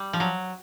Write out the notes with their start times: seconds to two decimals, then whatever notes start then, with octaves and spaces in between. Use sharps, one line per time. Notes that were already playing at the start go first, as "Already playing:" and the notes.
Already playing: G3
0.13 F3
0.20 F#3